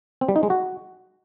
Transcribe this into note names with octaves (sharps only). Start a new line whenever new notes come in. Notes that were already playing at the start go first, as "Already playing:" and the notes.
C4
G3
D#4
G#3
F#4